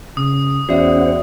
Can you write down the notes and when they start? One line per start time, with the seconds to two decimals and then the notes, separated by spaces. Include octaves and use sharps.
0.17 C#3 D#6
0.69 E2 C#4 F#4 C5 D5 E5 F#5